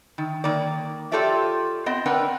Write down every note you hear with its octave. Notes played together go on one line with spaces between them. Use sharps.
D#3
D#3 A#3 D5
F4 G4 A4 C#5 D5 E5
B3 C4 D#5
C4 D4 A#4 B4 F#5 G5